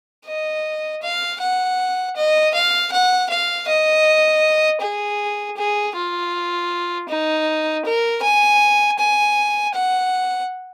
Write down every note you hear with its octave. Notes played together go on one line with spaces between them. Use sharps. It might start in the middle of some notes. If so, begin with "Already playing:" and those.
D#5
F5
F#5
D#5
F5
F#5
F5
D#5
G#4
G#4
F4
D#4
A#4
G#5
G#5
F#5